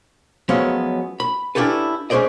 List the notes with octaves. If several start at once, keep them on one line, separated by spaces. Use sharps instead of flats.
F3 F#3 G#3 A3 B3 C#4
B5
C#4 D4 E4 G4 A4 B4
G#3 C#4 G#4 C5 D5 D#5